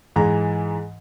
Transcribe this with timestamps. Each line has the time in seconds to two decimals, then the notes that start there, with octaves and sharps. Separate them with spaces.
0.16 G#2 E3 G#3 A#5